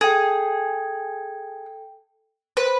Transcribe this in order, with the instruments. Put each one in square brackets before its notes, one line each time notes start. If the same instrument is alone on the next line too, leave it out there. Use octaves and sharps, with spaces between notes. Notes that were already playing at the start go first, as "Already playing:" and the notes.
[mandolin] G#4 [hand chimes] A4 G5
[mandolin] B4 [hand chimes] C5